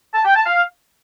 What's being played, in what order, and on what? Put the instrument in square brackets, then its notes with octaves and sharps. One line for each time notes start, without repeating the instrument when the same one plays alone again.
[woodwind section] A5
G5
A5
F5